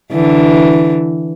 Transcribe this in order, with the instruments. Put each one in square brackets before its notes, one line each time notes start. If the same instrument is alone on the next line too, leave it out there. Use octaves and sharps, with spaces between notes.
[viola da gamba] D3 E3